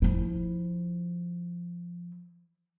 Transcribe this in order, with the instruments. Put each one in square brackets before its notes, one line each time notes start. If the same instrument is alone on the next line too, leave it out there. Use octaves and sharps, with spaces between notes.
[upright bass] F3 E4